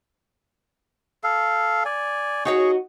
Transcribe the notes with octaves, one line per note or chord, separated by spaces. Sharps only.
A4 F5
D5 G#5
D#4 F#4 G#4 C#5 C#6